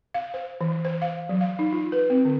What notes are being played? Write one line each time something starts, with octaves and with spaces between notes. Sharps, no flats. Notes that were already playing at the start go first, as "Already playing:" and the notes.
F5
C5
E3
C5
F5
F#3
F5
D#4
F4
B4
C4
D3